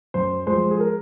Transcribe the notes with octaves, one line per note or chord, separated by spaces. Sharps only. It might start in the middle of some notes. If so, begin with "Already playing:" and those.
F#2 C5
F3 G#3 C5
G#4
A#4